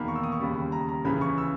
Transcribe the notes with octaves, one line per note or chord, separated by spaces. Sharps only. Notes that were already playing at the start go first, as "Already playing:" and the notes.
Already playing: E1 E2 D#3 A#3 B5
C#6
E6
D#6
C#6
D#2 C#3 G3 B5
A#5
A#5
C#2 C#3 E3 B5
C#6
E6